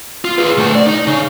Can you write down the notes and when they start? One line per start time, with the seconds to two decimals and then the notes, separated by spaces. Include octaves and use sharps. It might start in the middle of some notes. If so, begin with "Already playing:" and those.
0.25 F4
0.38 G#4 B4
0.57 D2 A3
0.75 D5
0.87 D#4
1.07 C#3